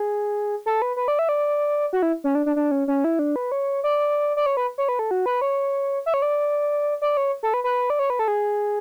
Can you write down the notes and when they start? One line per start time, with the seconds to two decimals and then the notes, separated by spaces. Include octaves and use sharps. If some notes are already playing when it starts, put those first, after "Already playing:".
Already playing: G#4
0.66 A4
0.82 B4
0.97 B4
1.08 D5
1.19 E5
1.29 D5
1.93 F#4
2.02 E4
2.24 C#4
2.35 D4
2.46 D4
2.56 D4
2.71 C#4
2.88 C#4
3.04 E4
3.19 D4
3.36 B4
3.52 C#5
3.84 D5
4.37 D5
4.46 C#5
4.57 B4
4.78 C#5
4.89 B4
4.99 A4
5.11 F#4
5.26 B4
5.42 C#5
6.06 E5
6.14 C#5
6.22 D5
7.02 D5
7.17 C#5
7.43 A4
7.54 B4
7.64 B4
7.90 D5
7.99 C#5
8.10 B4
8.19 A4
8.28 G#4